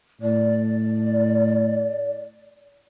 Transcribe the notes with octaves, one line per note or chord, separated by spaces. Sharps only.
A2 D5